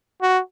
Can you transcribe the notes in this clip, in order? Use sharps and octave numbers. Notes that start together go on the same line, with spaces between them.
F#4